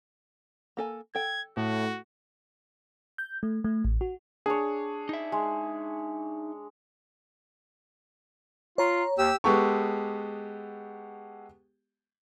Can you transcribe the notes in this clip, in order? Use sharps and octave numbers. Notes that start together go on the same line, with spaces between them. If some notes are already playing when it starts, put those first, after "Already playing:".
A#3 A4 G#5
A4 G5 G#6
A2 F#4
G6
A3
A3
A1
F#4
D4 G#4 C#5
D#4 E5
G#3
F4 C#5 A#5
D#2 G4 E6
G#3 B3 G4 A4 C#6